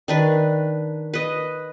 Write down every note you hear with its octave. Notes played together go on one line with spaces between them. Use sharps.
D#3 D4 B4
B4 D#5